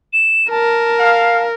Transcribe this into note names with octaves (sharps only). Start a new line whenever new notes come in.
E7
A#4 A5
F5